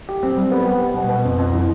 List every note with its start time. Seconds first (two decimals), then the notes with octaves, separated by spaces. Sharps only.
0.09 G4
0.23 C4
0.37 G3
0.52 B3
0.66 G3
0.81 B3
0.95 B2
1.09 B2
1.25 F2
1.38 F2
1.53 E3